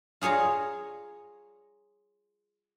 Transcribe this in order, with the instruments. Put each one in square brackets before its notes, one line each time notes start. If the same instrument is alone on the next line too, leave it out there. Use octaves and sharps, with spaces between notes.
[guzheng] F4 G#4 C#5 F5 A#5